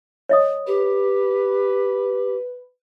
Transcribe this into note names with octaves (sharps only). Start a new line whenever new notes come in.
C#5 D#5 D#6
G4 B4